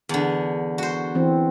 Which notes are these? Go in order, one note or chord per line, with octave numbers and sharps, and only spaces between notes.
E2 D3
F#4 C5
E3 C4